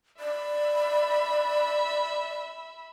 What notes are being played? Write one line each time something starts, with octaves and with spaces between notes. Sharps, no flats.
D5 E5 B5